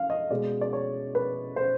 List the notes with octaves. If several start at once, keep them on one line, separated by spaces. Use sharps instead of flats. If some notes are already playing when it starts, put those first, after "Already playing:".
Already playing: F5
D#5
B2 G#3 D5
D5
C#5
B4
C5